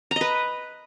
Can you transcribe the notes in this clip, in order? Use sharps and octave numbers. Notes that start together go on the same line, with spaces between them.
B4 D#5 A#5